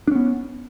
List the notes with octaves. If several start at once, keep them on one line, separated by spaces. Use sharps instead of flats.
B3 C#4 D4